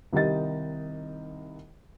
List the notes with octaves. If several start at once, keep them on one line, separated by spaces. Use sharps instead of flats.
C2 D#3 G3 D#4 D#5 A6